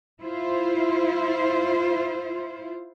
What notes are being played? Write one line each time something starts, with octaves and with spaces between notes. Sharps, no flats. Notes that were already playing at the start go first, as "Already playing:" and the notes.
E4 F4 C5